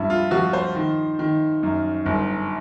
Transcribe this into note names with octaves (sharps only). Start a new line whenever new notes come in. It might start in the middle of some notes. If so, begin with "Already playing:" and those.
Already playing: G2 F3 E4
F4
F3 F#4
C5
D#3
D#3
F#2
G1